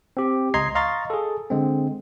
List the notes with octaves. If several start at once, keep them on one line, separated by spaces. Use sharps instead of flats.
C4 G4
C#2 D#5 A#5 C6 G#6 C7
D#5 F5 A#5 C6 C#6 A6
G#4 A4
D3 G#3 C4